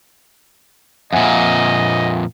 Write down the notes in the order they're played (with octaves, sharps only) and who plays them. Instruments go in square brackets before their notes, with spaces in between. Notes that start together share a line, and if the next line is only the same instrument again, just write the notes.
[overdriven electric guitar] F2 A#2 [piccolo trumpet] D#5 [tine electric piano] E5 F#5 G#5